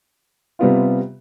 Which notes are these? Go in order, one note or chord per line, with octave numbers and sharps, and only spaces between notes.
C3 G3 B3 F4